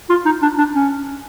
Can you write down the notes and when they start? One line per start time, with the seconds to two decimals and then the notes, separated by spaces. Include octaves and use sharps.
0.10 F4
0.25 D#4
0.42 D4
0.58 D4
0.74 C#4